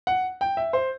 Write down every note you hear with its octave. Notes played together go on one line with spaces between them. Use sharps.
F#5
G5
E5
C5